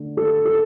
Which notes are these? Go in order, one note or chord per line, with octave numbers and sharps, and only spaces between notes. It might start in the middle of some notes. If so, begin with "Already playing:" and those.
Already playing: D3 A3
A4
A4